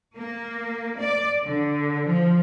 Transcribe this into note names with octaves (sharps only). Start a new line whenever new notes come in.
A#3
D5
D3
F3